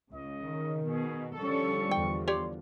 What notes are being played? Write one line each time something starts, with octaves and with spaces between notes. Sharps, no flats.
C#2 C#3 D#5
D#3
B2 G#4
D3 F3 G3 C#4 A4 C#6
E2 G5
G4 C#5 D5 C6